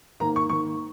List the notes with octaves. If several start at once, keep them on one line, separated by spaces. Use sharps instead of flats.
G#2 D#3 A#3 A#5
C#6
G#2 D#3 A#3 C#6